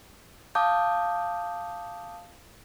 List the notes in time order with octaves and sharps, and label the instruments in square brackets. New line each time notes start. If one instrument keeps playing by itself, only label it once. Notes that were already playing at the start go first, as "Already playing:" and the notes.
[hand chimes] F5 A5 D6 D#6 G6